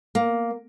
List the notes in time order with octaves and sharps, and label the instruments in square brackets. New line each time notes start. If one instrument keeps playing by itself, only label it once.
[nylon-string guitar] A#3